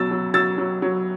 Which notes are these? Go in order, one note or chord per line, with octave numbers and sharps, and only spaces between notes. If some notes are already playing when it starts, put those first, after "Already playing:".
Already playing: B2 F#3 E6 A6
F#3
F#3 E6 A6
F#3
F#3